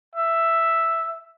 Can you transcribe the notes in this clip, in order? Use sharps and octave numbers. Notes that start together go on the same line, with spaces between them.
E5